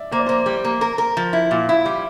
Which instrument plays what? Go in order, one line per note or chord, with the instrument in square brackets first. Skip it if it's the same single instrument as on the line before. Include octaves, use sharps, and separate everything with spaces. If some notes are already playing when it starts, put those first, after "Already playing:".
Already playing: [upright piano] D5 E5
[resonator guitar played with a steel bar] A#3 [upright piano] C5
[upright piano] D5
[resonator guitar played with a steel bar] A#3 [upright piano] C5
[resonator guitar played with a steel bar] G3
A#3
A#4
A#4
F3
E4
[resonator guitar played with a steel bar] A#2 [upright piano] F4
[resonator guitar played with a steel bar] E4
G3